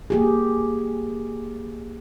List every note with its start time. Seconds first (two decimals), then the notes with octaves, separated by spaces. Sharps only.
0.10 A#3 G4 G#4